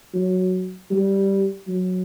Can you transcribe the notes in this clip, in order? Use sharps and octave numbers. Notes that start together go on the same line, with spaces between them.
F#3
G3
F#3